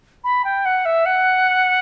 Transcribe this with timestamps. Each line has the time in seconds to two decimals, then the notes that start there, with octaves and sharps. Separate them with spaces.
0.24 B5
0.44 G5
0.65 F#5
0.85 E5
1.05 F#5